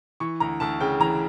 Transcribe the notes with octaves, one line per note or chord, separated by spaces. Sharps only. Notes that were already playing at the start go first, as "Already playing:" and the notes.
E3 C#6
D2 A#5
D2 A5
C#3 G5
E3 A#5